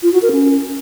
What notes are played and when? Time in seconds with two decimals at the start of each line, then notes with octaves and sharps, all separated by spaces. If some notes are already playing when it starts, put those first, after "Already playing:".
0.03 F4
0.12 F#4
0.22 A#4
0.32 C#4